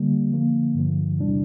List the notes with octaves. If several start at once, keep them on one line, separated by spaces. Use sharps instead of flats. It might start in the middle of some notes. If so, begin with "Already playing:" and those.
Already playing: D3 G3 A#3
D3 F3 A#3
G2 D3 F3
E2 C3 E3 G3 D4